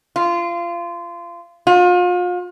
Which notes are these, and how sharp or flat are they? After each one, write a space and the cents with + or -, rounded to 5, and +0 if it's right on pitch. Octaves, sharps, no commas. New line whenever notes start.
F4 -25
F4 +35